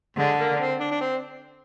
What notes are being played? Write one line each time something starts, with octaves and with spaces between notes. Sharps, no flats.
D3 G#3
A#3
C4
D4
D4
C4